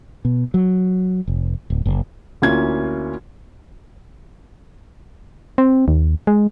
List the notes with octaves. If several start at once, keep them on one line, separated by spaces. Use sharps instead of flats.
B2
F#3
F1
D1
F#1
D2 A#3 C#4 E4 F4 G#6
C4
D#2
G#3